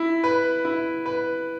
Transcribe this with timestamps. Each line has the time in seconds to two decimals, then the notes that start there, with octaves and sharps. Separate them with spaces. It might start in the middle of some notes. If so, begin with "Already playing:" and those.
Already playing: E4
0.24 B4
0.65 E4
1.06 B4